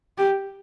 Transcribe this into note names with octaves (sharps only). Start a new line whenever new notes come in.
G4